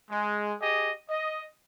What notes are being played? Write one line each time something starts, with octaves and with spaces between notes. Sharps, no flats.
G#3
G4 G#4 D#5
D#5